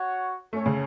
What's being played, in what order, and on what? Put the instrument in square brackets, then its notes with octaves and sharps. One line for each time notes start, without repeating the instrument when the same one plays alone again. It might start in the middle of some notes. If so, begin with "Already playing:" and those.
Already playing: [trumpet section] F#4 C#5 F#5
[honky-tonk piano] A3 [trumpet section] C#4 A4 C#5
[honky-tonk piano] C#3